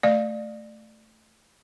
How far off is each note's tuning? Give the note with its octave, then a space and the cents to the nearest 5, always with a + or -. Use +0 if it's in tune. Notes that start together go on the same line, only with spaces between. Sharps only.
A3 +0 D5 +25 F5 +0